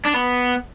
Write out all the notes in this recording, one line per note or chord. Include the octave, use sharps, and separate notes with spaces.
D4
B3